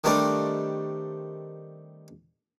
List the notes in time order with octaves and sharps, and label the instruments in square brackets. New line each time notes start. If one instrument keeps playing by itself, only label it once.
[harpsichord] D#3 G3 A3 C4 D4